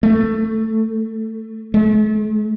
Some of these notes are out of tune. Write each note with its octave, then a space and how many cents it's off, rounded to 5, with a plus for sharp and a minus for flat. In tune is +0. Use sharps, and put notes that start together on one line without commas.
A3 +10
A3 -45